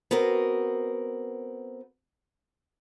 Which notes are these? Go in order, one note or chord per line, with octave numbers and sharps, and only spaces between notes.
B3 C4 F#4 A#4